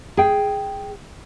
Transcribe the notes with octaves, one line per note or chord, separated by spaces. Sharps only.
G#4 G5